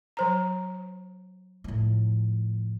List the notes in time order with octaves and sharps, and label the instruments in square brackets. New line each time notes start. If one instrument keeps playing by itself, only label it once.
[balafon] F#3 C5 A#5
[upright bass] A2 F3